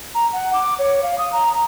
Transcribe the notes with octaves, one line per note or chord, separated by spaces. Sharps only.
A#5
F#5
D6
C#5
F5
D#6
A#5
A#5